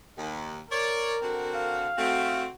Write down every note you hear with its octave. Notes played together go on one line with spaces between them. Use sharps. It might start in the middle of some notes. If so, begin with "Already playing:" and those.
D#2
A#4 C#5 D5
D3 C4 F#4
F5
A3 C4 F#4